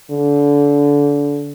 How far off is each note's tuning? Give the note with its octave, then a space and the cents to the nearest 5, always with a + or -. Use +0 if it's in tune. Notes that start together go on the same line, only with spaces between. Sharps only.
D3 -30